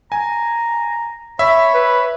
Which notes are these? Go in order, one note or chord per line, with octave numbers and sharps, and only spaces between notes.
G#5 A#5
C#5 E5 B5
B4 B5